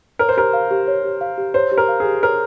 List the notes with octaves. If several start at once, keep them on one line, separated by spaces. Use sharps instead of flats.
A#4 C#5
C5
G4 A#4
F5
G4
C#5
G4
F5
G4
C5 C#5
G4
A#4
F5
G#4
G4
A#4 C#5